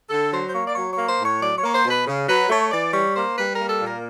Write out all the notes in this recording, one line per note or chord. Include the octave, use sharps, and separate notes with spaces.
D3 A4
F#3 C5
C5
A#3 C#5
D5
F#3 C#5
C#5
A#3
C5
A2
C#5
F#3 D5
A#3 C#5
C5
B2
B4
C#3
F#3 B4
A3 C#5
E3 D5
G3 C#5
A#3 C5
G3 B4
A#4
A#3
A4
A#2
A#4